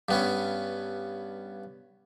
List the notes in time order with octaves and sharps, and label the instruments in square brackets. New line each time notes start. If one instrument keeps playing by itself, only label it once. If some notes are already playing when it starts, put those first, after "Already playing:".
[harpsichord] G2 B3 C#4